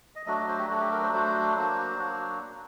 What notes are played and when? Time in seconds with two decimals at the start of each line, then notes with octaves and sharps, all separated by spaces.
0.16 D#5
0.26 F#3 A3 D4 F#4 D#5
0.37 D#5
0.48 C5
0.58 G4
0.69 F#3 A3 D4 F#4
0.80 G4
0.92 A#4
1.02 C5
1.12 F#3 A3 D4 F#4 C5
1.55 F#3 A#3 D4 F#4
1.98 F#3 A#3 D4 F#4